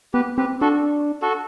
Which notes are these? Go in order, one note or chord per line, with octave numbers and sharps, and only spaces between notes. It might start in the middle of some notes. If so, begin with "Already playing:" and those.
B3 G4 B4
C4 G4 B4
D4 F#4 A4
F#4 A4